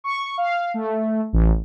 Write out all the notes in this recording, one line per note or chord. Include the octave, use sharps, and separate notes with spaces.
C#6
F5
A3
A1